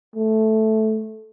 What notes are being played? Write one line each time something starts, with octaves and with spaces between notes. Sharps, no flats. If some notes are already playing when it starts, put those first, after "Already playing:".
A3